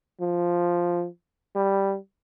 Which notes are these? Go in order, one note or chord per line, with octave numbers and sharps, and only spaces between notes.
F3
G3